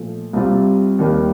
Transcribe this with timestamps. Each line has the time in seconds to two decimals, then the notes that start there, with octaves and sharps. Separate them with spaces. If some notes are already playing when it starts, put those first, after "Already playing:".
Already playing: A#2 F3 A3
0.33 C2 C3 G3 C4 F4
0.99 D#2 D#3 G3 A#3